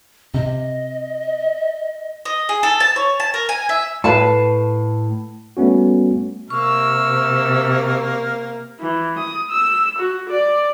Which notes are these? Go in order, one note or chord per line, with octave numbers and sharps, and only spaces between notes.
C3 D#5
D#5
G#4
A4
A5
C#5
A5
A#4
G#5
E5
A2 B4 F5 A5
G3 A3 B3 C#4 F#4
C3 A#3 C#6 E6 F6
E3
D#6
E6
F#4
D5